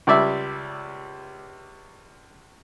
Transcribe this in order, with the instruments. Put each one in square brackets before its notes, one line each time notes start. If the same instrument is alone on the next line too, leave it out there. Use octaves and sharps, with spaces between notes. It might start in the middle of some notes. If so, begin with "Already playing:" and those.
[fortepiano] C#2 G3 D5 E5